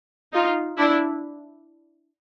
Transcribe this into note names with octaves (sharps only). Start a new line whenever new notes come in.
D#4 F4
D4 E4